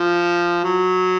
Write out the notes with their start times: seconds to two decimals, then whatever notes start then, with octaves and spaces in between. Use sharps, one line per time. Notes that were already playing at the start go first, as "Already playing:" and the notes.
Already playing: F3
0.64 F#3